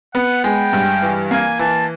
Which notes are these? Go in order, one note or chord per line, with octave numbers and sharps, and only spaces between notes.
B3 F#5
G#3 G5
G2
E3
A#3 G#5
E3 A5